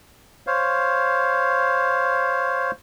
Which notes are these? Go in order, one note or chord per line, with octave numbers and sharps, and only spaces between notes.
C5 C#5 F5